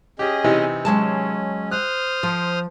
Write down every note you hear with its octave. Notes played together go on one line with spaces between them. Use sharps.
C#4 G4 G#4 D#5
C3 E3 D#4
F#3 G#3 C#4 A5
C5 D#6 F6 F#6
F3